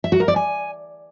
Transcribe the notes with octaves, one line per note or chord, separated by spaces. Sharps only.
E5
F#4
A#4
D5
G#5